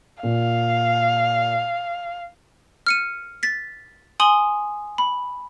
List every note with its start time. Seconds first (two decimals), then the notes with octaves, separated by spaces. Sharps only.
0.23 A#2 F5
2.86 F6 C#7 D#7
3.43 A6 B6
4.20 G#5 C6 D#6 F#7 G7
4.98 B5